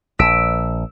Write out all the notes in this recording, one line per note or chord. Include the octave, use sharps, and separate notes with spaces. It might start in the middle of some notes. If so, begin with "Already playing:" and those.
A#1 E6 B6 D7